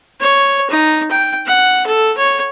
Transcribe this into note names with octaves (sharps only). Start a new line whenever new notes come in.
C#5
D#4
G5
F#5
A4
C#5